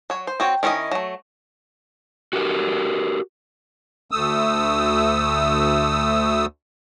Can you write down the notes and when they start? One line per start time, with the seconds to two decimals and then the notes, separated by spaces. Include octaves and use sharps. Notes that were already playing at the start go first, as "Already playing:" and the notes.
0.10 F#3 C#5
0.27 C5
0.40 C4 F#4 C#5 G5
0.63 D#3 C#4 E4 F4 D#5
0.91 F#3 A3
2.33 F#4 G4 A#4
4.11 D2 A3 D#6 E6